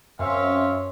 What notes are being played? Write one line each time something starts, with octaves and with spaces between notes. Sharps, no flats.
F#2 C4 C#5 E5 F5